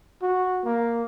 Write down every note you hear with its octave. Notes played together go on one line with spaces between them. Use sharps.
F#4
A#3